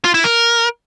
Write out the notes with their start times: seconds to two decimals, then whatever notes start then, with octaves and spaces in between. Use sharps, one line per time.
0.05 F4
0.14 E4
0.24 A#4